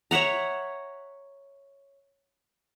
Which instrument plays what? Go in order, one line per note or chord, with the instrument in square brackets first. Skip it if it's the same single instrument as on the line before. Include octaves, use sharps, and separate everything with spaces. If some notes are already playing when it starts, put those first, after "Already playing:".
[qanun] C#5 E5 F#5 A#5